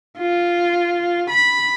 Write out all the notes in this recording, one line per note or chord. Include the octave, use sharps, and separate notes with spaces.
F4
B5